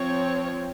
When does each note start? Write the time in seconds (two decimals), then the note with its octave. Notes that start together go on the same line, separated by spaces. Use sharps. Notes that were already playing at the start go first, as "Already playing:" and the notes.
Already playing: F3 C4 C#5